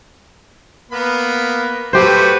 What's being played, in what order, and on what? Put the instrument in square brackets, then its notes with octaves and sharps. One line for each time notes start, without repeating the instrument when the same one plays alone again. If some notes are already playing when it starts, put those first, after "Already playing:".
[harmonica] A#3 B3 B5
[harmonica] A3 F#4 B4 [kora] G4 C5